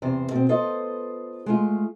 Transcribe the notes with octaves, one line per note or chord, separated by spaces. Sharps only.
E2 C3 C5
B2 C4
B3 F4 A4 C5 D#5
G#3 A3 F4